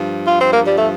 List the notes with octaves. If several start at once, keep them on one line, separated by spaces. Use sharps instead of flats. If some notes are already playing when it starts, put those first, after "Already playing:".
Already playing: G2 F3
F4
C4
A#3
G3
A3